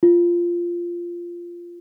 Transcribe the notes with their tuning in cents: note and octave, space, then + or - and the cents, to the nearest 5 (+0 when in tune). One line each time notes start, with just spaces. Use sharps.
F4 -10